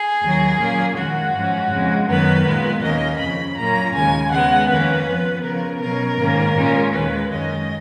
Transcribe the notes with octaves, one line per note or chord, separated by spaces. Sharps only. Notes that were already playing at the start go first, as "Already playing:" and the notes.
Already playing: G#4
D#2 D#3 F#3
A#2 F#3 A#3 C#4
F2 D#3 G#3 F#4
G#2 F3 G#3 C#4
F2 C#3 G#3
F#2 D#3 F#3 B3 B4
A#2 G#3 B3
D#2 D#3 A#3 C#4 D#5
F2 C#3 F3 B5
A#2 F#3 A#3 C#4 A#5
D#2 C#3 G#3 G#5
C#3 G#3 B3 F#5
F2 D#3 A#3 C#4 B4
F2 F3 B3
C#3 F3 B3 A#4
B2 F#3 C#4 A#4
G#2 D#3 A#3 C#4
A#2 G#3 C#4
D#2 D#3 G#3 B4
F#2 D#3 G#3 C#4 D#5